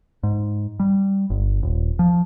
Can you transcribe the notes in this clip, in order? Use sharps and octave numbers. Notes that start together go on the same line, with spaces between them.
G#2
G3
G1
D#1
F3